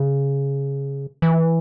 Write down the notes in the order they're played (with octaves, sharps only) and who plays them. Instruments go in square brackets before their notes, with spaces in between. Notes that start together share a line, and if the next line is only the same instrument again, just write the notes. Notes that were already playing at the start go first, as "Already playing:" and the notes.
Already playing: [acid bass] C#3
E3